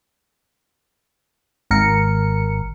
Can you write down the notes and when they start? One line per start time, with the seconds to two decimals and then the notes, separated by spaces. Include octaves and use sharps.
1.71 G#1 A#4 C#7